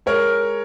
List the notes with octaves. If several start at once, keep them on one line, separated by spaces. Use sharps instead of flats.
G#3 A#4 C#5